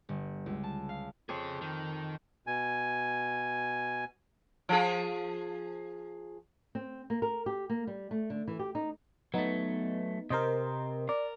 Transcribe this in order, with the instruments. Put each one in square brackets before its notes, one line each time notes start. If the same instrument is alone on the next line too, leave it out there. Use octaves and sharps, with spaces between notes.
[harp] G1
C#2
A5
F5
[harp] F2 [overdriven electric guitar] G#4 C#5
[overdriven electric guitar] D#3
[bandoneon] B2 G#5
[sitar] F3 G#4
[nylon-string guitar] C4
A#3
A#4
G4
A#3
G3
A3
D3
E3
G4
D#4
[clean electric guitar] F#3 A3 [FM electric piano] B3 D#4
[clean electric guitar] C3 C4 [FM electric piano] A#4 C5 D#5
[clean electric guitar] A#4 [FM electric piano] D5